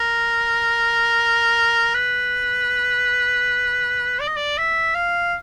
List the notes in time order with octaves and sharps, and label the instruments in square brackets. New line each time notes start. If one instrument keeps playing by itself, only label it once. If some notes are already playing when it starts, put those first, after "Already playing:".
Already playing: [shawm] A#4
B4
D5
D#5
D5
E5
F5